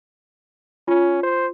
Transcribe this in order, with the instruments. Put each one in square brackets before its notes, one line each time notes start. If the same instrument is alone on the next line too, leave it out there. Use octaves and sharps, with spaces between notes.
[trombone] C#4 [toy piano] F4
[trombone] C5